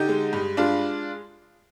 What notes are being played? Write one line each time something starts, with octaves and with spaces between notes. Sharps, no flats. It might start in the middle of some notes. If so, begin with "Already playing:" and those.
Already playing: D3 D#4 G4
G#3
G2
G#3 D4 F4